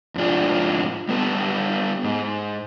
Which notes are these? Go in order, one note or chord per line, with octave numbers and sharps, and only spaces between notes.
F2 G#2 D4 F4
G3 B3 A4
G#2